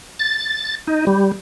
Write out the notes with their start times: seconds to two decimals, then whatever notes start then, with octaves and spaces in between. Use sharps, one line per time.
0.19 A6
0.87 D#4
1.07 G3